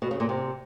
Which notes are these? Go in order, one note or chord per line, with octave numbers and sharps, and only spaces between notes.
B2
C#3
A#2
C3